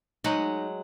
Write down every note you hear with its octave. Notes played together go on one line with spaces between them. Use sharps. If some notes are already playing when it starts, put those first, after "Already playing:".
F#3 G#3 D#4 F#5